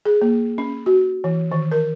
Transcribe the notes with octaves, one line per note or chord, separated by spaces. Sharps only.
G#4
A#3
C#4
F#4
E3
D#3
A#4